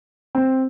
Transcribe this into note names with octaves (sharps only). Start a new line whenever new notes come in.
C4